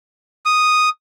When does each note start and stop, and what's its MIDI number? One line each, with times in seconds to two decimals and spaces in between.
0.46 0.89 87